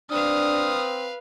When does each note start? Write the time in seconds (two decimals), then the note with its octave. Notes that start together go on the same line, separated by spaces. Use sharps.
0.11 C4 D4 B4 F5 D#6 F6